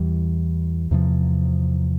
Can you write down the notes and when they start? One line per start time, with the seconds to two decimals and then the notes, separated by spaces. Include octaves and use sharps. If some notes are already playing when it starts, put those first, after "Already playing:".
Already playing: E2 E3 G3
0.91 E2 C3 F3